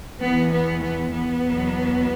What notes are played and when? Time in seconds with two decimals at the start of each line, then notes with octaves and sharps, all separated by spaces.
0.22 E2 E3 B3
0.52 B3
0.83 B3
1.13 B3
1.42 E2 B2 F#3